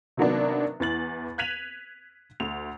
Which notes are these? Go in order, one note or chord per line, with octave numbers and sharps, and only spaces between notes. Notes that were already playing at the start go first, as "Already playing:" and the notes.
C3 D#3 F#3 A#3 B3 D4
E2 E3 A6 F#7
F#6 G#6 B6 D#7 F7 F#7
D2 F7